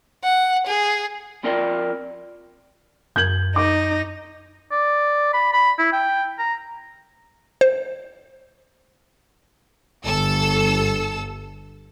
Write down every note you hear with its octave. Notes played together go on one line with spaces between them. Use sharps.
F#5
G#4
F2 C4 F4 A#4 D5 G5
F#2 G6 G#6 F#7
D#4 D6
D5
B5
B5
E4
G5
A#5
C5
G1 A4 E6